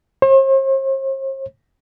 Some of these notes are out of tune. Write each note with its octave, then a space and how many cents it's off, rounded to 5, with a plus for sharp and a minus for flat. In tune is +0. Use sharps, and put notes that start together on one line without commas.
C5 +45